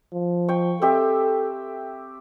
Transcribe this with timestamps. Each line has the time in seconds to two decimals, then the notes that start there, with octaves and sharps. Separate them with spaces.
0.13 F3
0.49 G5 C#6
0.82 C4 G4 A4 E5